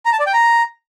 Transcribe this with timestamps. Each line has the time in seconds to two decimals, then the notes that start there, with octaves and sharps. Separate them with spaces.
0.05 A#5
0.13 A5
0.20 D5
0.27 G5
0.34 A#5